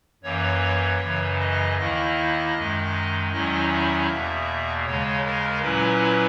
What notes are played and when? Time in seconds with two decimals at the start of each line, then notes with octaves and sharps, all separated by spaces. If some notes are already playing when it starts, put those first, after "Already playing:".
0.23 F#2 E3 A#3 C#5
1.01 F#2 C#3 E3
1.39 D#5
1.77 D#2 D#3 A#3 E4 D#5
2.55 F#2 D#3 G#3
3.31 E2 D#3 F#3 C#4 E4 D#5
3.70 E5
4.08 E2 B2 A#3
4.85 D#2 C#3 G#3 C#5
5.24 A#4
5.62 A#2 F#3 C#4 E4 B4